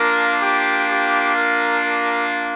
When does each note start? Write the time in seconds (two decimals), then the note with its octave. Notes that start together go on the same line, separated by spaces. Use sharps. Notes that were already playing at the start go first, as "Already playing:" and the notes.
Already playing: A#3 D4 F4 A#4
0.41 G4
0.88 G4
1.35 A#4
1.82 A#4